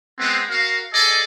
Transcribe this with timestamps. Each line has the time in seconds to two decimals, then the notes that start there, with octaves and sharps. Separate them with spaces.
0.19 G#3 B3 C4
0.49 F#4 A#4 F5
0.93 G#4 A4 D5 D#5 G#5